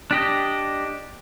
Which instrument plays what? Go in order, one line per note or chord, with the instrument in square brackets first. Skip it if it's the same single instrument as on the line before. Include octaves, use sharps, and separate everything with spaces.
[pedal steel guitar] D4 G4 D#5